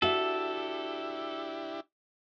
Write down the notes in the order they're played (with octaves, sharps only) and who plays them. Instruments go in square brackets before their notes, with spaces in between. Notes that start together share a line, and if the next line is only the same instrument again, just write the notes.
[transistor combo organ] D4 E4 G4 [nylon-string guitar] F#4 E5 [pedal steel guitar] A4